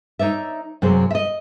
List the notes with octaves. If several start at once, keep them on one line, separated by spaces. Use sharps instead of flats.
D#4 C#5 D5 E5
F#2 C3 A#3 F#4 G#4 C5
D#5 E5